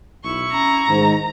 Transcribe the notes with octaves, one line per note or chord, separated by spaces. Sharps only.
B1 E4 C#6
C#4 A#5
G#2 D#3